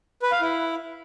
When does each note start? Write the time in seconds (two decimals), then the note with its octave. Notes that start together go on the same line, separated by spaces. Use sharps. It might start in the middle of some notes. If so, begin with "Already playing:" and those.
0.22 B4
0.32 F5
0.41 E4